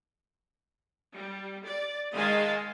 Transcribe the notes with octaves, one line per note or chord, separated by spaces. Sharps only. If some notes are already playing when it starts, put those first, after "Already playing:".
G3
D5
D#3 G#3 D#5 F5 G#5 A5